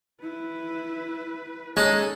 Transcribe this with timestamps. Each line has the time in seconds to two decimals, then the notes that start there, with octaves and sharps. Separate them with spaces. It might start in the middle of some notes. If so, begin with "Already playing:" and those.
0.21 E4 B4
1.77 G#3 C#4 D#4 A4 A5